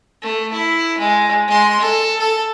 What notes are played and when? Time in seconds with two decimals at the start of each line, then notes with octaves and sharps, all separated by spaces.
0.22 A3
0.53 E4
0.98 G#3
1.48 G#3 C6
1.81 A4
2.19 A4